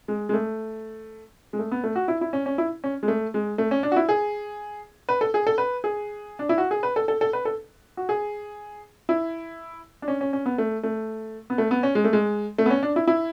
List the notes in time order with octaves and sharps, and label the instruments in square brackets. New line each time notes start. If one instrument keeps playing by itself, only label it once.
[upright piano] G#3
G#3
A3
G#3
A3
B3
A3
F#4
E4
E4
C#4
C#4
E4
C#4
G#3
A3
G#3
A3
C#4
D4
F#4
E4
G#4
B4
A4
G#4
A4
B4
G#4
D4
E4
F#4
G#4
B4
A4
A4
A4
B4
A4
F#4
G#4
E4
D4
C#4
C#4
C#4
B3
A3
A3
B3
A3
B3
C#4
G#3
A3
G#3
A3
B3
C#4
D4
E4
E4